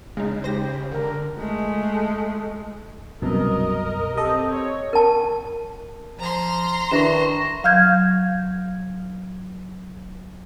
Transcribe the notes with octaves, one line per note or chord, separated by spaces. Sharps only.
C#3 G#3 D#4
G4 C5 A#6
D3 A#4
G#3 A3
C2 F#2 B2 A#4 D#5
C4 G4 A4 D#5
C#5
A#4 A5
F3 A#5 C6
D#3 D4 E4 B4 C#6 A#6 E7
F#3 F5 F6 G6 G#6